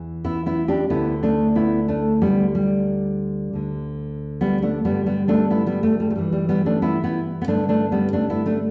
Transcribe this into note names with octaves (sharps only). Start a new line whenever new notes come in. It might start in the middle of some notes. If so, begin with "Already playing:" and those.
Already playing: E2 E3
B3 E4
B3 E4
D4 G4
D2 D3 B3 E4
A3 D4
B3 E4
A3 D4
D2 D3 G3 B3
G3
D2 D3
G3 B3
A3 D4
G2 D3 G3 B3
G3 B3
A3 D4
B3 E4
G3 B3
A3
G3
A3
G2 E3 G3
G3
G3 B3
A3 D4
B3 E4
B3 E4
B3
G2 D3 A3 D4
A3 D4
G3 B3
A3 D4
B3 E4
A3 D4